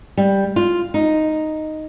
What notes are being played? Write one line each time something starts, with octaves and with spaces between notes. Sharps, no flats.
G3
F4
D#4